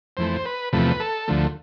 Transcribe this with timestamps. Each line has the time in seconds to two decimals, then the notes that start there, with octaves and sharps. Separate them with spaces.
0.17 F2 E3 A3 C5
0.46 B4
0.72 E2 C3 F3 A3 B4
1.00 A4
1.28 D2 D3 F3 A3